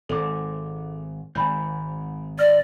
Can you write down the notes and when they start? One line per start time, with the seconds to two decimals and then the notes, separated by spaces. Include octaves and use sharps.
0.09 G#1 G#2 A4 D6
1.35 G#1 G#2 G#5 B5 G6
2.39 D5 F6 A#6